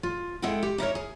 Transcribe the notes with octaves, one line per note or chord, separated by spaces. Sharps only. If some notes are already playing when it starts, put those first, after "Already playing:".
F4
G#3 E4 G#4 A4 F#5 G5
G4
D#4 E4 A#4 C#5
G#4